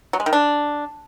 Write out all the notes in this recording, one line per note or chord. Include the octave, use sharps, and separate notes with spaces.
F#3
G#3
D#3
D4